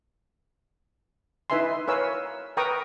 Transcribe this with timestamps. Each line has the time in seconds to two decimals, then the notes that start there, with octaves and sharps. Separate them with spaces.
1.50 D#4 E4 B4 E5 G#5 C6
1.88 A#4 B4 C#5 F5 G#5 E6
2.57 A#4 B4 G5 A#5 C#6 D#6